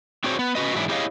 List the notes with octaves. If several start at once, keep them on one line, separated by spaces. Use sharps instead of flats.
C4 D4 F#4 G#4 C5 C#5
B3
C#4 F#4 B4 D#5
G#2 E3 F#3 D4 E4
E4 G4 G#4 C#5 D#5 F5